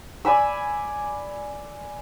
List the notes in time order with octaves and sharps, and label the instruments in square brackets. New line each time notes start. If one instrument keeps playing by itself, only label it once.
[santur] D5 G#5 B5 E6